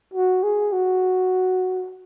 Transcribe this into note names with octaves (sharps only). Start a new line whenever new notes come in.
F#4
G#4
F#4